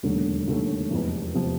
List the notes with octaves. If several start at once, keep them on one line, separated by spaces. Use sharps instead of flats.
E1 D#2 D3 F#3 A3
E1 D#2 D3 F#3 A3
F1 E2 C3 F3
C3 F3